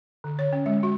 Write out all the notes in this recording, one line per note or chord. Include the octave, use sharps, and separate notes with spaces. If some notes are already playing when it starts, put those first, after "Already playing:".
D3
C#5
C#4
G#3
F#4